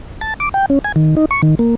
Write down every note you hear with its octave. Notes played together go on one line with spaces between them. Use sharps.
A5
D6
G5
C#4
G#5
D#3
D#4
C#6
D#3
A#3